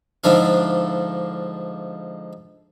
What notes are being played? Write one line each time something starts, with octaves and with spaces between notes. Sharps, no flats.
G#2 D3 F3 D4 E4 F5